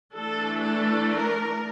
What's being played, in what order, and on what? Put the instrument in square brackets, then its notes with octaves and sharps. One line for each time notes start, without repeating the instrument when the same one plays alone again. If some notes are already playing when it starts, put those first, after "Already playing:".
[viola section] E3 A3 D4 A4
A4
A#4